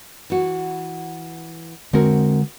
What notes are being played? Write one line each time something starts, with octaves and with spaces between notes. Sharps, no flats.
E3 F#4
D3 G#3 C4 F#4 A#4